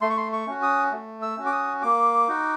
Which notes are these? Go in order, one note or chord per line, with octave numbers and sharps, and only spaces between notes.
A3 C6
C#6
C6
C#6
C#4 F#4
D#6
A3
E6
C#4 F#4
D6
D#6
A#3 D6
D#4 F#4